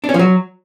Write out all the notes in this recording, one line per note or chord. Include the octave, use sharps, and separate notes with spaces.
D4
C#4
F3
F#3